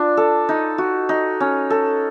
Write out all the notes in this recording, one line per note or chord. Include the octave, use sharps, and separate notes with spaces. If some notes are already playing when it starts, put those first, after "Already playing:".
Already playing: D4 F4
A4
D#4
F#4
D#4
C#4
A4